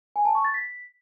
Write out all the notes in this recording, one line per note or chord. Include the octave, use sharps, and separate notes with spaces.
G#5
A5
C#6
A6
B6